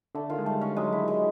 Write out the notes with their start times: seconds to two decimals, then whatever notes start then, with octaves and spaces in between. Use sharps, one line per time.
0.15 D3 A3
0.30 D#3 F4
0.38 G#3
0.46 G3 A3
0.61 G#3 C#4
0.76 F#3 G#3
0.93 E4
0.98 D#3
1.08 G#3